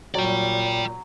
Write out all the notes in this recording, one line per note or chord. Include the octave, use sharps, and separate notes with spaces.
A#2 F#3 D5 G5